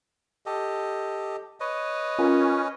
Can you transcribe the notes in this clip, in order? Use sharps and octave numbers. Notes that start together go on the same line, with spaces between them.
G4 A4 D#5
B4 C#5 D#5
C#4 F4 A#4